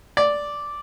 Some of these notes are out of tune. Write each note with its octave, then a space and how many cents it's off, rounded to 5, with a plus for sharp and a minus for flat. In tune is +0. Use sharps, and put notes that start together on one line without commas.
D5 -5